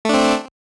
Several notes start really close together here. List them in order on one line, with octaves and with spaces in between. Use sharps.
A3 D4 C4